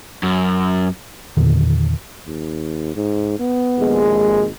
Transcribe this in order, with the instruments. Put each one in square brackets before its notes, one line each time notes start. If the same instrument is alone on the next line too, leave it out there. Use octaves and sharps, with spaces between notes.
[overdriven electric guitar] F#2
[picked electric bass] E2 A#2 D3 D#3
[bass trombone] D#2
G#2
B3
[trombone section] A#1 D#2 G#3
[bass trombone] G#1